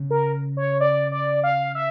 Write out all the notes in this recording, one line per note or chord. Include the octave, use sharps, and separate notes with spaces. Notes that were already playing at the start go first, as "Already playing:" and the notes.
Already playing: C#3
A#4
C#5
D5
D5
F5
E5